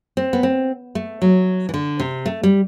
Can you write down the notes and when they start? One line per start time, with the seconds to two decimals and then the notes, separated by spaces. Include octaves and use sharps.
0.17 C4
0.33 B3
0.43 C4
0.95 A3
1.22 F#3
1.69 E3
1.74 D3
2.00 C3
2.26 A3
2.43 G3